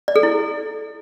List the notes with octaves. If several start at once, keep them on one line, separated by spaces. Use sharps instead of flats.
D5
A4
E4